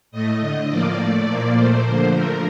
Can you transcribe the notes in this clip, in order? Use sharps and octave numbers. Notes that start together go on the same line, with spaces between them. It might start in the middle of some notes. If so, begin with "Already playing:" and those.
A2 A3 D#5
D3 A3
A2 F3 A#3 D5
A2 A3
A#2 F3 A#3 D5
A#2 A3 C5
D3 F3 A#3
D3 F3 A3 A#4